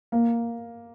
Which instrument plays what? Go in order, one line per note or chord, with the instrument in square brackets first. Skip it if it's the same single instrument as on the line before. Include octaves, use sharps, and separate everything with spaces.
[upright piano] A#3